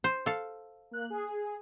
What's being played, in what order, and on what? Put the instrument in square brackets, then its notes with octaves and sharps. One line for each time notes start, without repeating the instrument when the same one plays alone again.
[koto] C5
A4 F5
[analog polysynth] A#3 F#6
G#4